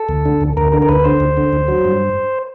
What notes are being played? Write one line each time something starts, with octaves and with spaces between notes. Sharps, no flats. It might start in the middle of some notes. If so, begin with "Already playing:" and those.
Already playing: A4
D2
D3
D2
D2 A#4
D3 A#4
A#4
D2 B4
D3 C5
D2
D3
D2
F#3
G2